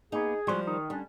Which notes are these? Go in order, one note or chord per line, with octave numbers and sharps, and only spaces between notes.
A#3 B3 D#4 G#4
F3 G3 G#3 F#4 C6
D#3 D#4
D3 G3 C#4 D4